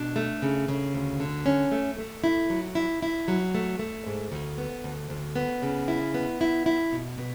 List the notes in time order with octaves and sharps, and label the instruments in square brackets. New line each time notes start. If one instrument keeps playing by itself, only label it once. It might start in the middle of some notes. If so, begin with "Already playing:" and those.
Already playing: [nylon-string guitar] B2 D4
A3
C#3
C#3
D2
D3
C#4
A3
A3
E4
F#3
E4
E4
F#3
A3
A3
G#2
D2
B3
D2
D2
B3
C#3
E4
B3
E4
E4
B2
B2